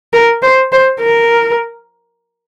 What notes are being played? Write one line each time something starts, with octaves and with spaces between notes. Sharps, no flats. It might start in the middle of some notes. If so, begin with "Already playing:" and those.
A#4
C5
C5
A#4